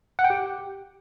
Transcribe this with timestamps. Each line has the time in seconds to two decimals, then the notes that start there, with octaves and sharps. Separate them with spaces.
0.19 F#5
0.24 G5
0.30 G4